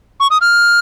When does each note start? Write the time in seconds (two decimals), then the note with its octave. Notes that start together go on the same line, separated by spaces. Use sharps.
0.20 C#6
0.30 D#6
0.41 F6